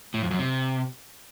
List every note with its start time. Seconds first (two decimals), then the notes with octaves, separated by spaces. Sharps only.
0.14 A2
0.22 F2
0.31 F#2
0.39 C3